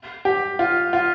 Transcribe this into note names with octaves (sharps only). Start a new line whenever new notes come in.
G4
F4
F4